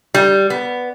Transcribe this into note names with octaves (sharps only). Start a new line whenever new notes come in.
G3
B3